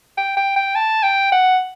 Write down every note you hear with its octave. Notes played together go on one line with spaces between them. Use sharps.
G5
G5
G5
A5
G5
F#5